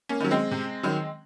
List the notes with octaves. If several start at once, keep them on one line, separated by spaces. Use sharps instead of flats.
A#3 C#4
D#3 F#3
G#3 C4
C3
D#3 F#3